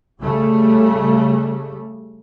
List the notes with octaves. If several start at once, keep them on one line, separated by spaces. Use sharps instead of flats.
C#3 G3 A3